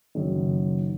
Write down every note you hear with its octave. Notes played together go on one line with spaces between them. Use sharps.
F#1 F#2 D#3